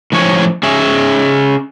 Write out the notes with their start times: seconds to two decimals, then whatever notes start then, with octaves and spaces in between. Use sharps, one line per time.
0.12 A2 F3 C#4 C#5
0.63 C#4 G#4 E5